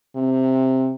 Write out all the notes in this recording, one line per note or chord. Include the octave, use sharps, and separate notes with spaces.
C3